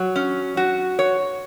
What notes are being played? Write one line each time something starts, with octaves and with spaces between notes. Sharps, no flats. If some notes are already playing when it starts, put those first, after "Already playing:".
Already playing: F#3
C#4
F#4
C#5